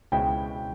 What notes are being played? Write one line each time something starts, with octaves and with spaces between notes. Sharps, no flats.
C#2 B2 G#3 C4 E4 G5